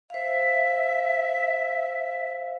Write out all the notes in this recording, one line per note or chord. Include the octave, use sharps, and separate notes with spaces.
C5 E5 F5